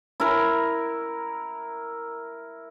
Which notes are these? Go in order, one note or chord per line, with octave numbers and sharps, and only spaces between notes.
E4 A#4